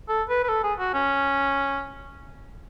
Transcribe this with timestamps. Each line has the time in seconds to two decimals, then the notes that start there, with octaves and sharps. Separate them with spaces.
0.09 A4
0.29 B4
0.44 B4
0.49 A4
0.63 G#4
0.79 F#4
0.94 C#4